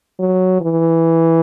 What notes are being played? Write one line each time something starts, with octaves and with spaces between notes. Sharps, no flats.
F#3
E3